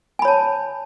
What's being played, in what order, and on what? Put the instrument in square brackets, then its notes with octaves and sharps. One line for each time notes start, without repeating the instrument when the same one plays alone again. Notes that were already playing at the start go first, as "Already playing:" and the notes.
[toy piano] G#5
B5
C#5
A5